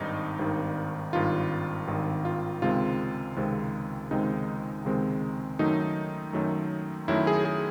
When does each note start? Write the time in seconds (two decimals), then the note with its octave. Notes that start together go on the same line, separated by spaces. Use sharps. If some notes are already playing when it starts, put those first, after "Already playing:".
Already playing: G#1 G2 D#3 D#4
0.39 G#1 G2 D#3
1.13 G#1 G2 D#3 F4
1.88 G#1 G2 D#3
2.25 F4
2.62 C#2 C3 D#3 G#3 C4 F4
3.36 C#2 C3 D#3 G#3 C4
4.11 C#2 C3 D#3 G#3 C4 D#4
4.85 C#2 C3 D#3 G#3 C4
5.59 F#2 D#3 F#3 A3 D#4
6.33 F#2 D#3 F#3 A3
7.08 F#2 D#3 F#3 A3 E4
7.27 G#4
7.45 G#4